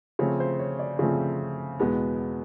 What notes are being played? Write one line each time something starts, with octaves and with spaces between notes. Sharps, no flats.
C#3 F3 A3 C4 C#5
C5
C#5
D5
C#3 F3 A3 C4
E2 B2 G#3 B3